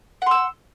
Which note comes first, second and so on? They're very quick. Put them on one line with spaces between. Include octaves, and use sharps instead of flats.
F#5 C6 E6